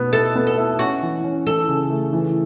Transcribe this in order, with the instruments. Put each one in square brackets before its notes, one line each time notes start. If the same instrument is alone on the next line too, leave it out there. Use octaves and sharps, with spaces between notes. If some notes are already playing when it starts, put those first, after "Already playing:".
Already playing: [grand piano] B2 B3
[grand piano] E4 [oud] A4
[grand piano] B3
[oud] A4
[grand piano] E4
[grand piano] C#4 [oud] F#4
[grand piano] E3
C#4
[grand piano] E3 [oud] A4
[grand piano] C#3
A3
E3